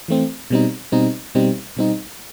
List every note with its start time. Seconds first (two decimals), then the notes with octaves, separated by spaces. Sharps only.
0.08 E3 A3 C4
0.50 B2 G3 C4 D#4
0.92 B2 G3 C4 D#4
1.35 B2 G3 C4 D#4
1.77 B2 G3 C4 D#4